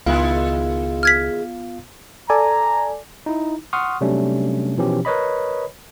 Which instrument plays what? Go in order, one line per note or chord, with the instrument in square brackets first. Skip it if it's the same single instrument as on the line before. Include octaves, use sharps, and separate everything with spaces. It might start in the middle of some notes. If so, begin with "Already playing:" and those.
[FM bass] C#2 [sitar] D#3 G#3 E4 [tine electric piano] B3 F4 F5
[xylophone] F6 G#6 B6
[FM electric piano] A4 D5 G#5 [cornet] A#5
[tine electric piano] D#4 E4
F#5 C6 C#6 D#6 F6
C3 F#3 G3 A3 C#4 D4
B2 E3 F3 C#4 G4
A#4 B4 C#5 D#5 B5